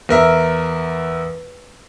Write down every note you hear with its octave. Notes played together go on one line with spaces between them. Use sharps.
E2 A#4 E5